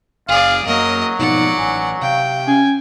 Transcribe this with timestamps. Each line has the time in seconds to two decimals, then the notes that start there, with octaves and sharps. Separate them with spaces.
0.29 F#1 G#4 D5 F5
0.66 F#2 F#3 A#3 A#4 D#5
1.19 G#2 B2 F3 D#4 D5 F#5
1.58 A1 G#5
2.02 C3 F5 G5
2.47 C#4 G#5